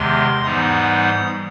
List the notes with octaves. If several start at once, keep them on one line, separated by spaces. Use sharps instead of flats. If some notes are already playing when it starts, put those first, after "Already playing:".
Already playing: E2 C3 D#3 G#3 C6
G#2 E3 G3 B3 D#4 D#6